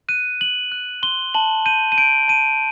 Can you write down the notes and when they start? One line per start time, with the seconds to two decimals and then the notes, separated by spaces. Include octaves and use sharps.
0.09 F#6 D#7
0.41 F#6 F#7
0.72 F#6
1.03 C6 G7
1.34 A5 F#7
1.66 G6 D#7
1.92 D#7
1.98 G6 D7
2.28 A5 D#7